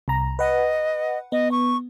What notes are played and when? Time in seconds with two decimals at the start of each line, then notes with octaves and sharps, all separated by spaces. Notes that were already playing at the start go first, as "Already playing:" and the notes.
0.08 C2 A#5
0.39 B4 D#5 F#5
1.32 B3 D#5
1.51 C#6